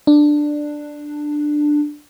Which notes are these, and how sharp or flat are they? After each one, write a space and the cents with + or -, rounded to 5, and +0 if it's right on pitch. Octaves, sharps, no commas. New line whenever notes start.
D4 +10